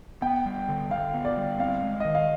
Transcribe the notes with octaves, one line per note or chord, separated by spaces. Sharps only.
B3 G5
G3
D3
D3 F5
B3
D5
G3
C4 F5
G#3
D#3 D#5
F5